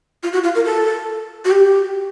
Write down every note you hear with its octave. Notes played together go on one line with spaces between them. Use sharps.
F4
F#4
F4
A#4
A4
F#4
G4